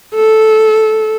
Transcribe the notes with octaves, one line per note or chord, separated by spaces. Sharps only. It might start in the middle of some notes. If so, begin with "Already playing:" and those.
A4